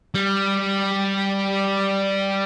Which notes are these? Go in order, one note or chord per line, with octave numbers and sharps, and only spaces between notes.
G3